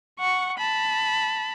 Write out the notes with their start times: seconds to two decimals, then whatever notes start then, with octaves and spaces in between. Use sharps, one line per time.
0.19 F#5 C#6
0.58 A5 B5